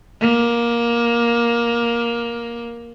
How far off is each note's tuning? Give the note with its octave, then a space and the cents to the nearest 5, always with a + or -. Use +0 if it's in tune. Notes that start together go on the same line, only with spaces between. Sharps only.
A#3 +15